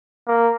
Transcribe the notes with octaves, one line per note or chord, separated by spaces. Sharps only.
A#3